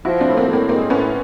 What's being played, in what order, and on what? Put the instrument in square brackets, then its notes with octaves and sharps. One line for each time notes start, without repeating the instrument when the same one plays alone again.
[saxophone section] F3 [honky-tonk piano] E4 F#4
[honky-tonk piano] C4 D4
[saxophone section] A2
[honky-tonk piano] A#3 C4
[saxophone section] A2
[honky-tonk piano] A#3 C4
[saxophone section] G#3 [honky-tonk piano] A#3 C4
[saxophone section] A2 [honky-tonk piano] B3 C#4